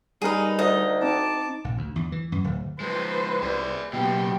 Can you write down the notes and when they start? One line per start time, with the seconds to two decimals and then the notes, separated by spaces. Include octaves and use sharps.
0.22 G3 D#4 G#4 A#4 B4
0.59 D2 D#5
1.02 C4 D#4 A5 D6
1.64 A#1
1.77 D2
1.96 E2
2.12 E3
2.32 F#2
2.44 D1
2.80 F3 G#3 B4 C5
3.42 C2 G#4 D5
3.93 B2 F#3 A#3 G4 G5